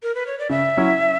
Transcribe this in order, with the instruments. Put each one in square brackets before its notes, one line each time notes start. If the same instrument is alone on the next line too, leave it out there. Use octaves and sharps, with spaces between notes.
[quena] A#4
B4
C#5
D5
[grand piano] C#3 [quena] E5
[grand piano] F#3 C#4 E4